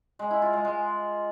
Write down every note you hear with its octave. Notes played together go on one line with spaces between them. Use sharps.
G#3
E4
F4
G#3
G#3